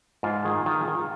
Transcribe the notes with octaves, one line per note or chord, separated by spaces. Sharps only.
G#2 F4
D#3 G#4
D#3 F4
G#4
D#3
F4